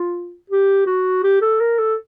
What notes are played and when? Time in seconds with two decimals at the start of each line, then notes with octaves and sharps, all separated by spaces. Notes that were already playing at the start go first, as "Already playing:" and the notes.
Already playing: F4
0.50 G4
0.87 F#4
1.24 G4
1.41 A4
1.61 A#4
1.79 A4